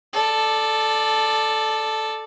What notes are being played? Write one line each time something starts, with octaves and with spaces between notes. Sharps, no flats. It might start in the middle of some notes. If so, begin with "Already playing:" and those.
A4 D5